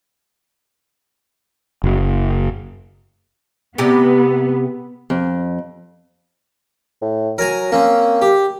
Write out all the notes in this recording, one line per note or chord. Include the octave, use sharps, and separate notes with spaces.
F#1
C3 B3 G4
F2
A2
F#3 A#4 G#5 A#5
A#3 C4 C#4
G4